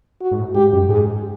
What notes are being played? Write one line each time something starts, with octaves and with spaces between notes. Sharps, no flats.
F#4
G#2
A2
G#2 G4
F#2
G#2 G#4